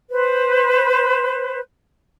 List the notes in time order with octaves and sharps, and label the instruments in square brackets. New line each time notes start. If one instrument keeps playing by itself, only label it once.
[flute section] B4 C5